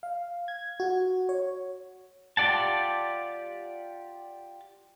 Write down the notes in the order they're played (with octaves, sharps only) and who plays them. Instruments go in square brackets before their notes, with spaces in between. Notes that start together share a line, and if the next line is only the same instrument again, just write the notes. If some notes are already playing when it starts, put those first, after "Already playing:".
[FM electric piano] F5
G#6
F#4
C#5
[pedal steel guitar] F4 G4 D5 F#5 A5